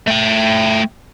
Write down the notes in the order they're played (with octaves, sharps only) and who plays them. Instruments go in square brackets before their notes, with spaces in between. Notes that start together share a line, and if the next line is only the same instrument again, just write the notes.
[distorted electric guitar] A3 G5